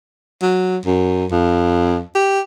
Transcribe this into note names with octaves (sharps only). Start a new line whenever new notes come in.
F#3
F#2
F2
G4